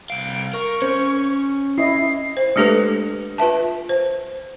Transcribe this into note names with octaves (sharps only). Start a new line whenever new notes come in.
C2 F5 D7
A#4 C#6
C#4 C5
E4 D#5 C7
C5
G#3 A3 D4 G4 A4 B4
F4 B4 E5 A5
C5